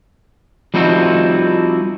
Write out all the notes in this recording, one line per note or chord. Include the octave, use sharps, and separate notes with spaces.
F3 G3 C4 D#4 E4 F#4